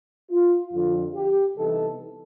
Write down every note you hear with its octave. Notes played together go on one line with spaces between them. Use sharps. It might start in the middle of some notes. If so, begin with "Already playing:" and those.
F4
F2 D3 F3 F4
G4
C3 E3 G3 B3 D#4 A4